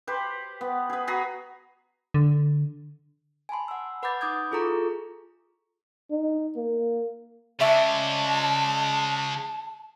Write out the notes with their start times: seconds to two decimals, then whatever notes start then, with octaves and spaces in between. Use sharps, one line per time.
0.07 G4 B4 C5
0.61 B3
0.90 G#4 B4
1.07 F#4 G#4 A#5 B5
2.14 D3
3.49 G#5 A5 B5 C6
3.68 F#5 E6
4.03 B4 F#5 B5 D6 G6 A6
4.21 D#4 D6 D#6 G6 G#6
4.51 E4 F4 G#4 A4 A#5 C#6
6.11 D#4
6.56 A#3
7.60 C#3 G#3 D5 E5 A5 C#6